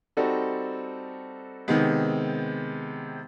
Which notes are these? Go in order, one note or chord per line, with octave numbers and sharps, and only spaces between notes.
G3 C4 D#4 F#4 A4
C3 D#3 G#3 B3